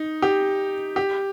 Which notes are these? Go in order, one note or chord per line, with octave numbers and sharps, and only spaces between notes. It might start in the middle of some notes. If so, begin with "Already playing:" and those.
Already playing: D#4
G4
G4